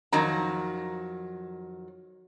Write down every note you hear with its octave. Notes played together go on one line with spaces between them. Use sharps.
F2 D#3 F#3 A#5